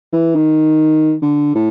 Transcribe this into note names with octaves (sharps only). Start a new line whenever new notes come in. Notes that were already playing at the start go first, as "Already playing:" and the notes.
E3
D#3
D3
A2